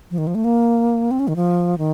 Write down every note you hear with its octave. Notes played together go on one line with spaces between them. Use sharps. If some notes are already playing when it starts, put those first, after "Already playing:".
F3
D#3
F3
A3
A#3
C4
C#4
D#3
F3
D#3